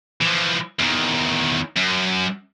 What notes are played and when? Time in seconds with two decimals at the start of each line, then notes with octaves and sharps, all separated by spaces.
0.21 E3 F3
0.79 E2 D#3
1.76 F#2